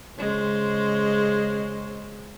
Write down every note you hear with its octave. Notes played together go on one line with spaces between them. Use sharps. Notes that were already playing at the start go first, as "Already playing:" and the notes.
C#3 G#3 C5